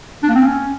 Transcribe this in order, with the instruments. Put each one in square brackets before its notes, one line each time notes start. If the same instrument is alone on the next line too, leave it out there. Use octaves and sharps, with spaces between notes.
[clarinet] D4
A#3
C4
C#4